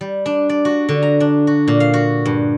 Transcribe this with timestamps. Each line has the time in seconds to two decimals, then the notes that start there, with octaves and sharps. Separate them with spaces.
0.01 G3
0.26 D4
0.49 D5
0.65 F#4
0.89 D3
1.02 A#5
1.20 D4
1.47 F#4
1.68 A#2
1.80 F5
1.93 F#4
2.26 G2